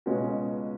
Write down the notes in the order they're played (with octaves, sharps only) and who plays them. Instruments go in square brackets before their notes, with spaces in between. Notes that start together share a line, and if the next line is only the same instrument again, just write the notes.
[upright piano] C#2 B2 G#3 C#4 F#4